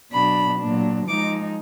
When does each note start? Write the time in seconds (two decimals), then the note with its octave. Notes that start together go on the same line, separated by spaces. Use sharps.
0.12 B2 F#3 D4 B5
0.59 A#2 F#3 D4
1.07 F3 G#3 D#4 D6